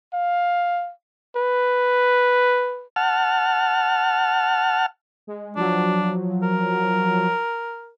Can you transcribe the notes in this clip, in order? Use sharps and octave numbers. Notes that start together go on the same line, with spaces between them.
F5
B4
F#5 A5 F6
G#3
F3 F#3 D4
A#4